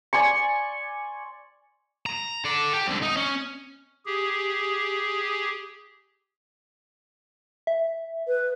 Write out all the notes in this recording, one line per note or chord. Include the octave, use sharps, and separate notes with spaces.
D5 G#5 C6 C#6
A#5
A4 D5
G4
C2 D3
D#4
C#4
G4 G#4
E5
B4